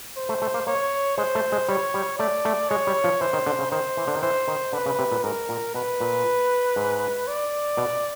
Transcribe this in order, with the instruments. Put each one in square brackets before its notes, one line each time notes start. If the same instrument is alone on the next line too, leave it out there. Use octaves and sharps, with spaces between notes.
[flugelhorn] C5
[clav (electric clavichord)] A3
A3
A#3
[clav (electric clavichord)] A#3 [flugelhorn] C#5
[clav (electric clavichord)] G#3 [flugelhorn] C5
[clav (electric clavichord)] A3
G#3
[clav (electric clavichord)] G3 [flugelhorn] C#5
[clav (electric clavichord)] G3
[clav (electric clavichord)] A3 [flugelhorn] D5
[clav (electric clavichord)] A3
[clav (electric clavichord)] G#3 [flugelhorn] C#5
[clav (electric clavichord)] G3
F3
[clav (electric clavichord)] E3 [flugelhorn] C5
[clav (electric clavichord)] D#3
D3
C#3
[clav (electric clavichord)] D#3 [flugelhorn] C5
[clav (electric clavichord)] E3
D3
D#3
[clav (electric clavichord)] E3 [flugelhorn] C5
[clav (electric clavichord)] D#3
[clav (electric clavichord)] D3 [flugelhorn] B4
[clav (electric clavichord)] C#3
C3
A#2
[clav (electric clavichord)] G#2 [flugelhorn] A#4
[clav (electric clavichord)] A#2
[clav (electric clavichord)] B2 [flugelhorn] B4
[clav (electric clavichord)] A#2
G#2
[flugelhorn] D5
[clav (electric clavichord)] B2